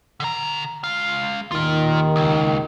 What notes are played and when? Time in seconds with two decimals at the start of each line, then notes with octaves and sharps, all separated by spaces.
0.20 D3 A#5
0.84 G#3 F5
1.52 D#2 D#3 F4 A#4
2.16 C#2